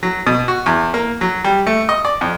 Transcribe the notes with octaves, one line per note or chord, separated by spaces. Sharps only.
F#3
B2
F#4
E2
A#3
F#3
G3
A3
D#5
D5
F2